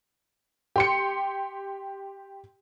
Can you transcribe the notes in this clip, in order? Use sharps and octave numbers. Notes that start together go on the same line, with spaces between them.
G4 C6 C#7